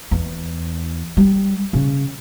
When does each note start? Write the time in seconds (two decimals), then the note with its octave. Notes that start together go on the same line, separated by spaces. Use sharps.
0.11 E2
1.17 G3
1.73 C#3